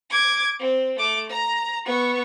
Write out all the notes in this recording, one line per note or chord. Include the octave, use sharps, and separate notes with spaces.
D6 G#6
C4
A3 D6
A#5
B3 C#6